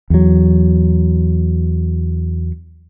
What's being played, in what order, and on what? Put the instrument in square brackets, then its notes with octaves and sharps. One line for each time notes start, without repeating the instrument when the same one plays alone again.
[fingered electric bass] E2 F#3